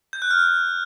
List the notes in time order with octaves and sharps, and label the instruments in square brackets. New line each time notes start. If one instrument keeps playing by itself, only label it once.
[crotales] G6
F#6
F6